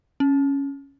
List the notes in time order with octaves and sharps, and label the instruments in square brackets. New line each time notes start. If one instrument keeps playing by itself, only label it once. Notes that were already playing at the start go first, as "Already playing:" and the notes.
[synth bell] C#4